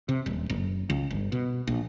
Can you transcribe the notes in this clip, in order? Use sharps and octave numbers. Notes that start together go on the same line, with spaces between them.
C3
D#1
F#1
C#2
G1
B2
A#1